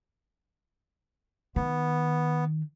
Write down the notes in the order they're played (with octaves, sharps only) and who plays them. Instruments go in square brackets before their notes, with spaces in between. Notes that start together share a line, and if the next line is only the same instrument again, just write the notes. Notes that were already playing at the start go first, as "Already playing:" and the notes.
[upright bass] D#3 [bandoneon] B3